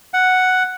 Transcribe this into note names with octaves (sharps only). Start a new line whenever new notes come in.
F#5